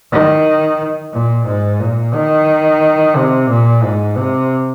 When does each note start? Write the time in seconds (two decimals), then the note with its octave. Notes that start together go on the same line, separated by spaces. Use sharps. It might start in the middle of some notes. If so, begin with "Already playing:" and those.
0.12 D#3
1.13 A#2
1.47 G#2
1.80 A#2
2.14 D#3
3.16 C3
3.49 A#2
3.83 G#2
4.17 C3